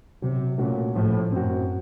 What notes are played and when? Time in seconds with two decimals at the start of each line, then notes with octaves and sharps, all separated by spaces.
0.22 C3 F#3
0.58 A#2 A3 C#4 F#4
0.95 A2 F3
1.32 F#2 C4 F#4